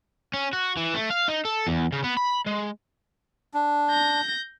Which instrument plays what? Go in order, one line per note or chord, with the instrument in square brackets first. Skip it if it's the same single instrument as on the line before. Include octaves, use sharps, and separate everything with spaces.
[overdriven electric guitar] C#4
F#4
E3
A3
F5
D#4
A4
E2
C#3
B3
B5
G#3
[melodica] D4
[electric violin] G6 A#6